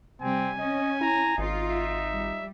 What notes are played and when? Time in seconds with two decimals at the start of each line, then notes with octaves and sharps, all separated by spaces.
0.21 C3 G3 C4 G#5
0.59 C#4 D#5
1.01 E4 A#5
1.38 G#1 D#4 F4
1.69 E5
2.14 G3